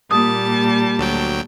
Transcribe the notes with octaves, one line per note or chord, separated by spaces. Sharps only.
A#2 G3 A5 D#6
D2 F#3 G5